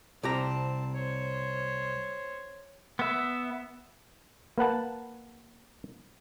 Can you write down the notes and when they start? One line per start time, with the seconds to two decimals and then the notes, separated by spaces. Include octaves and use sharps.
0.23 C2 C4 G4 A5 A#5
0.94 C5 C#5
2.99 B3 E5
4.58 A#3 B4 F#5 A5